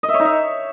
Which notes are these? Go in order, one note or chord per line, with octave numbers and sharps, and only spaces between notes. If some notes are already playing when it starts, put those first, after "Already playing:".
D#5
E5
C#5
D#4
E5